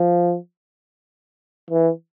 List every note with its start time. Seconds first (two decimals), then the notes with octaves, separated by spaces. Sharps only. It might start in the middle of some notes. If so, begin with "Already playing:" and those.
Already playing: F3
1.71 E3